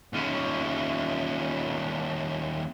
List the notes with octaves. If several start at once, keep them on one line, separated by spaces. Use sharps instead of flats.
D#2 C#4